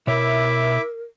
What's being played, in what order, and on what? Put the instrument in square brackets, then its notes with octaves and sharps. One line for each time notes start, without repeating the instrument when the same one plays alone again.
[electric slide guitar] B2 C#5 [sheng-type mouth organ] E4 E5 D6 [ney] A#4